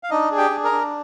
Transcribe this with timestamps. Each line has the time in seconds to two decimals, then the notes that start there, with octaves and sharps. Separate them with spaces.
0.03 F5
0.10 D4 D#4 D#5
0.32 G#4
0.37 G4 G5
0.50 D4
0.64 A#4 A#5
0.72 D4